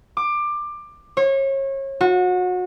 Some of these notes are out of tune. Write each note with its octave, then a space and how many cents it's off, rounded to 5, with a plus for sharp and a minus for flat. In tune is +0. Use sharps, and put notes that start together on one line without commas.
D6 +20
C#5 -30
F#4 -30